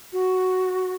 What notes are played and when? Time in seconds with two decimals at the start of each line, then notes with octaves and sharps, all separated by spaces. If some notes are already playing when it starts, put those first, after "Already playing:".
0.13 F#4